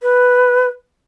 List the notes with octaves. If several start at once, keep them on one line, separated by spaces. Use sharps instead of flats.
B4